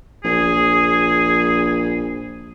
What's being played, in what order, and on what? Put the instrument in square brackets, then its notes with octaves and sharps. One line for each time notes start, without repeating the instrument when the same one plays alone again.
[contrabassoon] A#1 [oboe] G#4